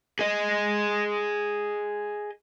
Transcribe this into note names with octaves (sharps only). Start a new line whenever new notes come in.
G#4 D#5